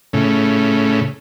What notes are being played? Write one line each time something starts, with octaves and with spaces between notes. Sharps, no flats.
A2 C#3